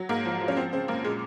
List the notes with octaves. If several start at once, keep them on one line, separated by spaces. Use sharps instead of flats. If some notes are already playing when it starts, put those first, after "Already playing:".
Already playing: F#3
G#2 A#3
F3
F3
C#4
F3 C4
C#3 C4
F#2 A#3
A#2 G#3